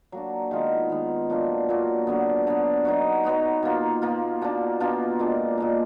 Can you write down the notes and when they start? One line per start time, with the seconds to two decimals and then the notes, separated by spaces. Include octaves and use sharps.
0.12 F#3 A#3 D4
0.51 D#3 G#3 B3 F4
0.90 D#3 G#3 B3 F4
1.30 A#2 F#3 D4 F4
1.69 A#2 F#3 D4 F4
2.07 D3 F#3 B3
2.47 D3 F#3 B3
2.85 F#3 B3 D#4 F#4
3.24 F#3 B3 D#4 F#4
3.63 B2 A#3 F4
4.02 B2 A#3 F4
4.41 B2 A#3 D4 F4
4.80 B2 A#3 D4 F4
5.19 A#2 G#3 D4
5.58 A#2 G#3 D4